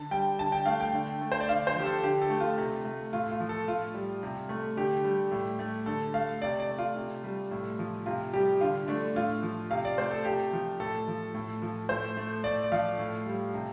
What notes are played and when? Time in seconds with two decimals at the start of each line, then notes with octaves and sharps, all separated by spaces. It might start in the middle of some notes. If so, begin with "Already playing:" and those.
Already playing: D3 A5
0.11 G3 G5
0.39 D3 A5
0.52 G5
0.66 A3 F5
0.81 G5
0.93 D3
1.21 A3
1.32 C5
1.40 D5
1.49 D3 F5
1.67 C5
1.76 F3 G4
1.85 A4
2.03 D3 G4
2.22 A4
2.30 A3
2.40 F4
2.58 C3
2.85 A3
3.13 A2 F4
3.32 F4
3.40 F3
3.49 A4
3.67 A2 F4
3.94 G3
4.23 C3
4.49 A3
4.77 D3 G4
5.04 G3
5.32 A2
5.59 A3
5.86 D3 A4
6.14 A3 F5
6.42 C3 D5
6.60 D5
6.69 A3
6.78 F4
6.96 C3
7.24 G3
7.51 A2
7.79 F3
8.06 C3 F4
8.33 G3 G4
8.61 D3 F4
8.88 A3 D4
9.16 A2 F4
9.43 F3
9.71 C3 F5
9.85 D5
9.98 A3 C5
10.11 A4
10.25 C3 G4
10.53 F3
10.80 A2 A4
11.08 F3
11.34 A2
11.62 F3
11.89 A2 C5
12.17 A3
12.44 A2 D5
12.63 D5
12.72 F3 F5
12.99 A2
13.26 G3
13.54 C3